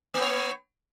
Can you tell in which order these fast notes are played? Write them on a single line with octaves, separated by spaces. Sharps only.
A#3 B3 C#5